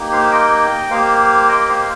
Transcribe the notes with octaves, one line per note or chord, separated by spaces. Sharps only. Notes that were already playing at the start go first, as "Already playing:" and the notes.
Already playing: A#3 D#4 G4
C5 F5
D#5 G5
A#3 G4 C5 F5
D#5 G5
C5 F5